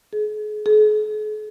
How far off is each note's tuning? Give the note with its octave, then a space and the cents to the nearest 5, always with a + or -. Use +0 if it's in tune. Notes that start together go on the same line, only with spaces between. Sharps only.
G#4 +35
G#4 +45